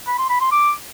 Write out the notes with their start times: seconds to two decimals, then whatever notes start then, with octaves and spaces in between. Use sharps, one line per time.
0.07 B5
0.18 C6
0.30 B5
0.41 C6
0.52 D6